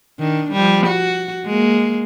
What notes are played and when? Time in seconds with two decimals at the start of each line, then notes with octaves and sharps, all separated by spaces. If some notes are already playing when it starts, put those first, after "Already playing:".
0.19 D#3 D4
0.52 F3 G3
0.87 F#4
1.46 G#3 A#3